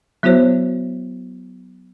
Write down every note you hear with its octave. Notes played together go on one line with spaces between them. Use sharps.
F#3 B3 E4 F#4 C5 C#5